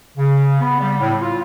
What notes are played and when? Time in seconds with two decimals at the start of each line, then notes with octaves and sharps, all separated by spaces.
0.18 C#3
0.61 B3
0.80 G3
1.01 A2
1.22 F4